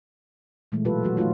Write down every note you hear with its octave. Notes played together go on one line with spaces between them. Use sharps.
A#2 E3 G#3 A3
B2 F#3 F4 G4 A4 B4
D#3 F#3 F#4
F3 A3 D#4 F4 F#4